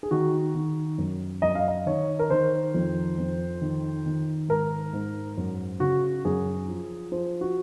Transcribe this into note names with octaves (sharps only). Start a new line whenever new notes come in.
G#4
D#3 F#4
D#3
F#2
F#2 D#5
F5
D#5
D#3 C#5
A#4
D#3 C5
F2
F2
D#3
D#3
G#2 A#4
G#2
F#2
C#3 F#4
F#2 G#4
F3
F3 C5
F#4